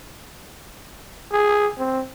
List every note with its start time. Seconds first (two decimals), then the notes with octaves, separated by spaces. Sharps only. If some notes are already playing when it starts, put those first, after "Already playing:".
1.32 G#4
1.78 C4